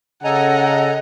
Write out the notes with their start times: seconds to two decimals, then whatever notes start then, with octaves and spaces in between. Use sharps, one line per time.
0.24 C#3 A4 D#5 F#5 G#5 A#5